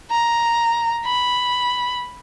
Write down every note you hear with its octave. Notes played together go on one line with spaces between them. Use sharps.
A#5
B5